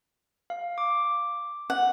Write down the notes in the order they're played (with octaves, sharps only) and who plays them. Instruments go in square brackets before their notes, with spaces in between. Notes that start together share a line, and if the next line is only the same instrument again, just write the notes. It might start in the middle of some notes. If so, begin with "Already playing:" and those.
[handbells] F5
D6
[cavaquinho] F#5